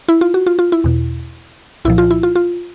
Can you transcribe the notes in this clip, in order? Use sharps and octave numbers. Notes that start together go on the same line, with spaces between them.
E4
F4
F#4
F4
F4
E4
E2 B2
C2 A#2 F3 E4
F4
E4
F4
F4